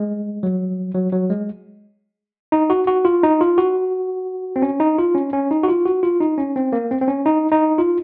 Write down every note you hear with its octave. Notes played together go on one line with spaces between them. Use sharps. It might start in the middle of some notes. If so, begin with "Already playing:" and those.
Already playing: G#3
F#3
F#3
F#3
G#3
D#4
F#4
F#4
F4
D#4
F4
F#4
C4
C#4
D#4
F4
C#4
C#4
D#4
F#4
F4
F#4
F4
D#4
C#4
C4
A#3
C4
C4
C#4
D#4
D#4
F4